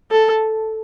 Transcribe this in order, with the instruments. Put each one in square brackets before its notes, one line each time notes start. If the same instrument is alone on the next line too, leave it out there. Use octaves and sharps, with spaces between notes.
[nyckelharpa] A4